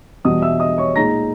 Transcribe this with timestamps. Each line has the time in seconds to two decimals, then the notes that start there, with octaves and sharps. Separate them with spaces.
0.24 E2 B2 G3 D#5 D#6
0.42 E5 E6
0.60 D#5 D#6
0.78 C#5 C#6
0.96 A#2 G#3 D#4 A#5 A#6